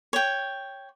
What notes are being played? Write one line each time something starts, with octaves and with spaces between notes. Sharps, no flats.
C#5 G5